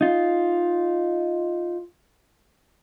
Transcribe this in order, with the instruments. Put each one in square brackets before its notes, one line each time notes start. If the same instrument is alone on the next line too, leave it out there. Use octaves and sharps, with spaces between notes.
[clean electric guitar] D#4 F4